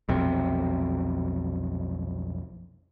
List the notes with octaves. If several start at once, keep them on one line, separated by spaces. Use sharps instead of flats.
B1 F2 C3